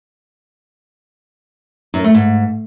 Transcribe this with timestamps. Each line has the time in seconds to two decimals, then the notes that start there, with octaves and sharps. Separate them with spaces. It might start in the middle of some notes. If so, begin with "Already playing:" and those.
1.94 F#2
2.04 A3
2.14 G#2